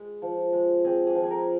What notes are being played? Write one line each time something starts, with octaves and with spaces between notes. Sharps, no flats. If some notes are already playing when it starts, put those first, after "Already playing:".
Already playing: G#3
F3
G#3
C4 G#4
G#4
F3
G#4
A#4